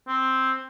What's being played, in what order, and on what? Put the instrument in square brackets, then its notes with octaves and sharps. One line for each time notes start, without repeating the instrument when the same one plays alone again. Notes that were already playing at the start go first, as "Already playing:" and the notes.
[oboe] C4